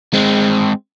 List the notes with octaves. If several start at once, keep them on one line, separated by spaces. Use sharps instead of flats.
G#3 C4